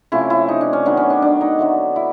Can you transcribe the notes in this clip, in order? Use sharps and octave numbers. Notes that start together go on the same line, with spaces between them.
C3 F3 A3 C#4 E4
E4
D#4
D4
C#4
D#3 F#3 B3 D4
C#4
D4
D4
D#4
D3 F#3 A3
E4